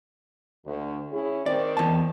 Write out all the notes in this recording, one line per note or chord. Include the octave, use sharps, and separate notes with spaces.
D2
C#4 E4 G#4
D#3 C4 D5
E2 A5